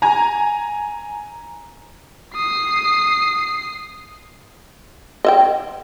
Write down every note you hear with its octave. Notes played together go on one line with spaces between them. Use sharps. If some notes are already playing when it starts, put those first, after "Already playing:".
G#5 A#5
D#6 C7
D#5 E5 G5